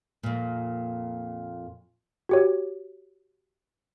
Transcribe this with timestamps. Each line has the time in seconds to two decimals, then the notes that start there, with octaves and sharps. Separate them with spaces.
0.23 F2 A#2
2.29 F#4 G4 C#5